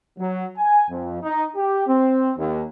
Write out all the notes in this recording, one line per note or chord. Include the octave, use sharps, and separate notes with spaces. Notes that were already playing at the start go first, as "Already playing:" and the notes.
F#3
G#5
F2
D#4
G4
C4
D#2